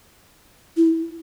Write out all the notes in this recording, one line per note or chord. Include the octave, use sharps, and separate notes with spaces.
E4